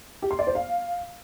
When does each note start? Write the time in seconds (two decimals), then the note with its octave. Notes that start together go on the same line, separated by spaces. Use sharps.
0.22 G4
0.31 C6
0.39 D5
0.47 C5
0.55 F5